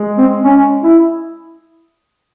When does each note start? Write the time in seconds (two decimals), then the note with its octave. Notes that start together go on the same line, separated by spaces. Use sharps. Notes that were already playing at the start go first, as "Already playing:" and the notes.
Already playing: G#3
0.18 C4
0.44 C#4
0.84 E4